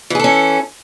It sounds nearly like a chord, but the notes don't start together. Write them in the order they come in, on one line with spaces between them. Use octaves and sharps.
E3 G#4 A4 C#4